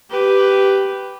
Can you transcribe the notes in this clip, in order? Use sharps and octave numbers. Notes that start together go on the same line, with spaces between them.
G4 B4